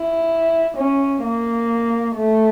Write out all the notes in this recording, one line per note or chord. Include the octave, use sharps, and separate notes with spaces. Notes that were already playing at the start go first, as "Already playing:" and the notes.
Already playing: E4
C#4
A#3
A3